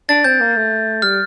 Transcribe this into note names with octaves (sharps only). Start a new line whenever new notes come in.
D4 A6
C4 G6
A#3
A3
G3 F6